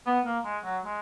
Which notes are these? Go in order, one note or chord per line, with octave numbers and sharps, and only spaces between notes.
B3
A#3
G#3
F#3
G#3